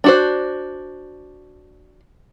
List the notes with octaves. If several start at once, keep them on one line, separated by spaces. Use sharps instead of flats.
D4 F#4 C5